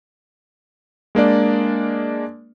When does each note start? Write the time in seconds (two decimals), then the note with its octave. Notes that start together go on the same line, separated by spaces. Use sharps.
1.15 G#3 A#3 D4 D5